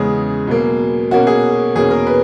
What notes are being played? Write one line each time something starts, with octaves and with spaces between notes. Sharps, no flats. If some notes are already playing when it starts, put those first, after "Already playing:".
Already playing: E2 C#3 G#3 G#4
B2 F#3 A#3
B2 A#3 C#4 F#4
G#4
E2 B2 A#3 C#4 G#4
A#4
B4